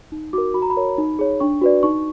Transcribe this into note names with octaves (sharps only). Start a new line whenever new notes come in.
D#4
F#4 A#4 D6
F#4 B5
A#5
B5
A#4 C#5
D#4
G#4 C#5
D4 C#6
F#4 B4 D5
D#4 C#6